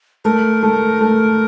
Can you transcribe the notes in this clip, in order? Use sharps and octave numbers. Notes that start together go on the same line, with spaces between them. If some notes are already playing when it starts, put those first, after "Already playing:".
A3 A#4
A3
A3